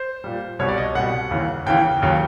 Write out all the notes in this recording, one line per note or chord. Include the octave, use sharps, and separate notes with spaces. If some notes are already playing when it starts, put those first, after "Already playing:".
Already playing: C5
A#2 G3
C2 B2 G3 C#5
D5
D#5
C2 B2 G3 F#5
D#2 C#3 E3
D#2 C#3 E3 G5
D#2 C#3 F#3